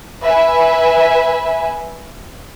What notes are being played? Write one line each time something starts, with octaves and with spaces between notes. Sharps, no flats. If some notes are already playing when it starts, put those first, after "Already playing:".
B4 E5 G#5